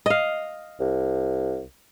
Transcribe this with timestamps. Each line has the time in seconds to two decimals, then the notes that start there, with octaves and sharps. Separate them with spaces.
0.06 D#5 F5
0.80 C2